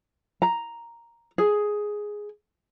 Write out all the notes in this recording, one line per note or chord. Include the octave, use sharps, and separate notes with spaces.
A#5
G#4